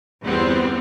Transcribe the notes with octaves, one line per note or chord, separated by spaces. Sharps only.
G1 E2 G3 B3 C4